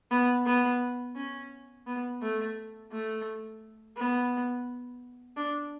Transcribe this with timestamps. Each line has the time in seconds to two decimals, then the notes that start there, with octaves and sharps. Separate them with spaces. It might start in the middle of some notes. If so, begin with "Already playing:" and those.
0.11 B3
0.46 B3
1.16 C#4
1.87 B3
2.22 A3
2.92 A3
3.97 B3
5.36 D4